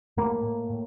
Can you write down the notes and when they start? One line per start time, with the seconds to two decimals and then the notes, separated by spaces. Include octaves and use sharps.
0.17 A2 A#3
0.43 A2
0.70 A2